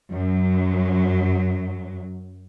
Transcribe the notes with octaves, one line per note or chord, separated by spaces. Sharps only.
F#2 F#3